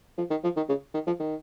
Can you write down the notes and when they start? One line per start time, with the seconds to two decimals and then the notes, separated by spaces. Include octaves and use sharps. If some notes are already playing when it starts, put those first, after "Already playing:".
0.18 F3
0.30 D#3
0.44 F3
0.56 D#3
0.69 C#3
0.94 D#3
1.07 F3
1.20 D#3